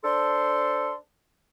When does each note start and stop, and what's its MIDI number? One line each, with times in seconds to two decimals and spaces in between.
0.04 0.94 62
0.04 0.94 69
0.04 0.94 72
0.04 0.94 84